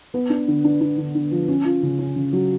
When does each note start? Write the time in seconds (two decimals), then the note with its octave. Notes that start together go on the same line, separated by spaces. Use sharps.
0.14 B3
0.30 D4
0.48 D3
0.64 D4
0.81 D4
0.98 D3
1.15 D3
1.31 F3
1.48 C#4
1.65 F4
1.83 C#3
1.99 C#4
2.16 C#3
2.33 F#3